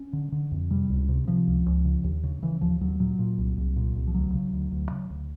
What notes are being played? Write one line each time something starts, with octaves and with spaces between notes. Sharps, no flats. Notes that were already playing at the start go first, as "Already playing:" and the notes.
Already playing: C#4
D3
D3
F2
C3 G3
C#2
C3
C3 F3
C#2
C#2
C#3
D#2
C#3
C#3 E3
D#2 F3
D#2 F#3
A#2 F#3
A#2
C2
C2
A#2
C2
F3
D2 F#3
C#3
D2
D2
C#3
D2